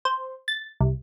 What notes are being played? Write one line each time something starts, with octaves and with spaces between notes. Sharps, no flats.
C5
A6
C2